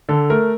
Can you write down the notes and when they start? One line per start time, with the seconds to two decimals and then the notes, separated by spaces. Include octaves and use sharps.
0.09 D3 A4
0.30 A3 A#4